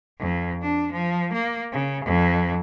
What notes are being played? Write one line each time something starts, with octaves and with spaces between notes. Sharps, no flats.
F2
D4
F3
A#3
C#3
F2